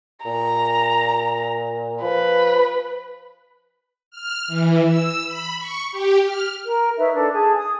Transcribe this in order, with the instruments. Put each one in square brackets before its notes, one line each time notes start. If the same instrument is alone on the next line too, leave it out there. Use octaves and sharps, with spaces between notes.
[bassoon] A#2 [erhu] A#5
[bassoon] F3 [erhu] B4
[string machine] F6
E3
E6
B5
C#6
G4
F6
[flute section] A#4
D#4 B4 C#5 E5
D4 A4
G#4 A5
D#6